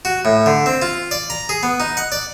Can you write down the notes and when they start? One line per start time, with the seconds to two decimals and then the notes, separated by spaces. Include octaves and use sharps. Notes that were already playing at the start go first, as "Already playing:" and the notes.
0.05 F#4
0.25 A2
0.46 D3
0.66 C4
0.82 F4
1.11 D5
1.30 A#5
1.49 G#4
1.63 B3
1.80 D#4
1.97 F#5
2.12 D5